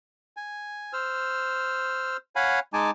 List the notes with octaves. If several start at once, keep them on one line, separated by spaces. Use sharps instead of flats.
G#5
C5 E6 F6
C#5 F5 F#5 G#5 B5
G#3 D#4 G#5 A5 D6